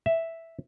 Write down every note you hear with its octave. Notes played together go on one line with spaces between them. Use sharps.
E5